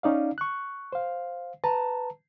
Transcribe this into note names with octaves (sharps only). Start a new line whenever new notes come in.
C#4 D#4 D5 F5
C#6 F#6
C5 F5
B4 A5 A#5